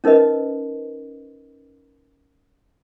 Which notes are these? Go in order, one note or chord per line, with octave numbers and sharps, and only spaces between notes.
C#4 D#4 A#4 B4 D#5